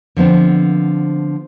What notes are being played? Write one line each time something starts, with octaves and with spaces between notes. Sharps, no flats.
D3 F3 B3 C4